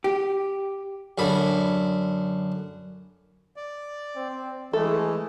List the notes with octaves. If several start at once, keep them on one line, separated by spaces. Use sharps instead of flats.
G4
F#2 D3 B5
D5
C4
E3 G#3 A3 A4